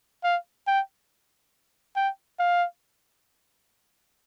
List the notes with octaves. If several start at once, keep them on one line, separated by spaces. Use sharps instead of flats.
F5
G5
G5
F5